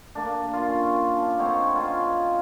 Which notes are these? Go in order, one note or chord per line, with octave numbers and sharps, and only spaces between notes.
A#3 D4
F4
C#4
D4
C4 D#4 C#5 F#5
C#4 F4